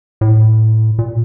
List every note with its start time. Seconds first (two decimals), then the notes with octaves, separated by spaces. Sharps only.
0.21 A2
0.99 A#2